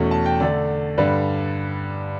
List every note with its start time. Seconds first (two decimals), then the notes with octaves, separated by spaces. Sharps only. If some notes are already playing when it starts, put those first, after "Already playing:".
Already playing: E2 B2 A3 C#4
0.11 A5
0.26 G5
0.40 D3 A3 D4 D5
0.98 G2 D3 G3 D4 B4